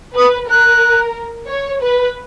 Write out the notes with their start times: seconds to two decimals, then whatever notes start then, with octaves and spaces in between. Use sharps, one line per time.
0.16 B4 D#6
0.49 A#4 F#6
1.49 C#5
1.82 B4